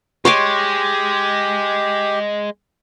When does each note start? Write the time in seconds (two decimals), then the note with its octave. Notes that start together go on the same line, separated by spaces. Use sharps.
0.25 G#3 G4 C#5 C6 D6